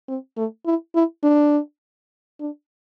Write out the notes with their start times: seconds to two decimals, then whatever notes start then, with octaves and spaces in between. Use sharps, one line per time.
0.08 C4
0.37 A3
0.66 E4
0.95 E4
1.24 D4
2.40 D4